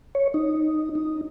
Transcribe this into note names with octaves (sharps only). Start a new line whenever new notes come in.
C#5
D#4
D#4